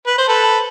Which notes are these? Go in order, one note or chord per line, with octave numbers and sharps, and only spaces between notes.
B4
C5
A4 B4